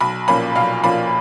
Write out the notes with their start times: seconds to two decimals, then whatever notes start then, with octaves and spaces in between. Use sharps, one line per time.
0.01 B1 B5
0.28 A#2 F3 A#3 C#4 B5
0.55 B1 F5
0.83 A#2 F3 A#3 C#4 B5